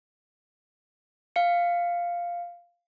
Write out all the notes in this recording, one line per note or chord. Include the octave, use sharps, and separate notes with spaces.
F5 C#7